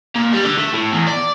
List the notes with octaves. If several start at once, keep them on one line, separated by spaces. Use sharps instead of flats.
A#2
G3
D3
A3
A2
E2
D5